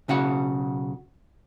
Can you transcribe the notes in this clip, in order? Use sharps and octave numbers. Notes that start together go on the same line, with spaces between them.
B1 C#3 F#4 F#5